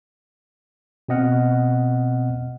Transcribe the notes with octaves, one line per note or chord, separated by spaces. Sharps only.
B2 C4 D#5 F#5 F6